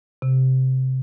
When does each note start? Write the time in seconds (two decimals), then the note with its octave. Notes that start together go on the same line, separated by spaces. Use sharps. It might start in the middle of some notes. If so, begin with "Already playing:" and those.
0.22 C3